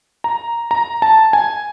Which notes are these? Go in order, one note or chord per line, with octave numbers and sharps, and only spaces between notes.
A#5
A#5
A5
G#5